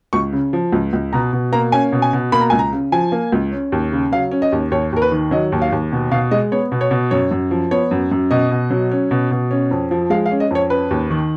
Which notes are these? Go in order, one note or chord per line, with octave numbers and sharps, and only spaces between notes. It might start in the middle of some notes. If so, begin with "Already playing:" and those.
C#2 C#6
C#3
F3
C#2
C#2
B2 A#5
B2
A#3 A#5
C#4 G#5
B2
G#5
B2
A#3 B5
A#5
C#2 G#5
A#5
C#3
F3 G#5
A#3
C#2
C#4
D#2
C#3
F#3 F5
C#4
D#5
D#2
D#2 C#5
D#2 A#4
B4
D#3
F#3 D#5
D#2
F5
D#2
B2
B2 F5
G#3 D#5
B3 C#5
B2
C#5
B2
F#2 C#5
F#2
F3
B3 C#5
F#2
F#2
B2 D#5
B2
F#3
C#4
B2
B2
C#4
F2
F3
G#3 F5
F5
C#4
D#5
F2 C#5
C#4 B4
D#2
D#3